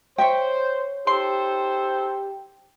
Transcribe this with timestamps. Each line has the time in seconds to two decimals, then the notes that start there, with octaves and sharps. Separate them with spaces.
0.18 C5 C#5 E5 G5
1.07 D#4 G4 A4 C5 C6